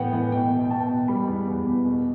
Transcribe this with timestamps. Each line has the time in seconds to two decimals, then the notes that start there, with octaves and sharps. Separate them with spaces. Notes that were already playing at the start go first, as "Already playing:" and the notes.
Already playing: A2 E3 B3 F#5 G5
0.13 E3
0.32 B2 G5
0.50 B2
0.65 G5
0.70 B2 A5
0.89 B2
1.08 G3 B5
1.28 E2
1.48 E2
1.67 E2
1.85 B2